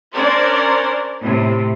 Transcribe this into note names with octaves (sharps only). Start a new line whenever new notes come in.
C#4 D4 A#4 C5 D5
A2 C3